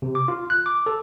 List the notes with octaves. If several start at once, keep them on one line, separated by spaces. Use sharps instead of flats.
C3
D6
F4
F#6
D6
A4